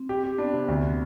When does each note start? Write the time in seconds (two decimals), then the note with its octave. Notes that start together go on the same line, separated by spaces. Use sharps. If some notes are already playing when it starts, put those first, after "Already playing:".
Already playing: C4
0.09 G4
0.24 G4
0.38 B3 D4
0.54 C3
0.68 D2